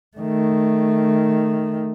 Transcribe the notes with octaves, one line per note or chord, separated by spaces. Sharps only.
D#3 A3